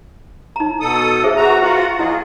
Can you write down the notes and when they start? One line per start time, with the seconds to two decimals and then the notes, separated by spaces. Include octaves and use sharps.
0.56 D#4 A#5
0.80 B2 A4 D#6
1.24 G#4 C5 E5
1.36 B2 F#4 A#5
1.62 F4 F#4 B4 F#5
1.99 A#3 E4 F4 G#4 D#5